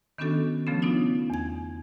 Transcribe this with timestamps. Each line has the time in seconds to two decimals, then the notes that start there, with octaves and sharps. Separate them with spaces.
0.18 D#3 B3 C#4 D4 F#4 A4
0.67 C#3 F3 A3 B3 C#4
0.82 B3 D4 D#4 F4
1.30 E2 G#6